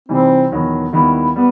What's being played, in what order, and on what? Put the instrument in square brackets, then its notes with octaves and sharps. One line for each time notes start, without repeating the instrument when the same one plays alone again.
[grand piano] C3 E3 G3 D#4 [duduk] C4
[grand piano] E1 E2 D#3 F#3 B3
D#2 D#3 G3 B3 E4
[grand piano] G3 [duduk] B3